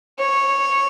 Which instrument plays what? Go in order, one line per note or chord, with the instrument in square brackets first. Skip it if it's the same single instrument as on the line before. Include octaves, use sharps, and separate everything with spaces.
[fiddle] C#5